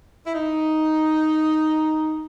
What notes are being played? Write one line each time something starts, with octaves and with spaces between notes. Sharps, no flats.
E4
D#4